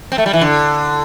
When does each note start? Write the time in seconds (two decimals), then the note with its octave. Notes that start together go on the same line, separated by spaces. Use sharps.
0.12 C4
0.18 A3
0.26 G3
0.33 E3
0.41 D3